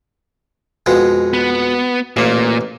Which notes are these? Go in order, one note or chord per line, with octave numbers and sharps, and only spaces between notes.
F2 B2 G#3
B3
A1 A#2 A#3